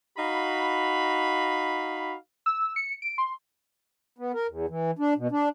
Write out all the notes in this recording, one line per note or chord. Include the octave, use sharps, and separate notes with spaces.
D#4 F#4 F5 B5
E6
C#7
D7
C6
B3
A#4
E2
E3
D4
B2
D4